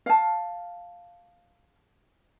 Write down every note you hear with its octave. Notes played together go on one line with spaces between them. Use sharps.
F5 A5